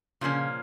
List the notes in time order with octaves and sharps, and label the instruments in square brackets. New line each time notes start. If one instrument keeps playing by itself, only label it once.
[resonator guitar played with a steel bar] A#2 F3 A#3 C#4 [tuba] C#3